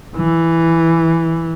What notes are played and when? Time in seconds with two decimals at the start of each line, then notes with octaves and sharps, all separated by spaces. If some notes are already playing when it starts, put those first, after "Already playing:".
0.16 E3